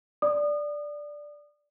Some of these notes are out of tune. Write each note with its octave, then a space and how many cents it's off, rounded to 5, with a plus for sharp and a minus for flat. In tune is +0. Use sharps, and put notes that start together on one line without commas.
D5 +0 D#6 -35